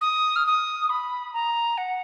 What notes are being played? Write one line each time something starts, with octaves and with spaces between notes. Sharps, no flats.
D#6
F6
D#6
B5
A#5
F#5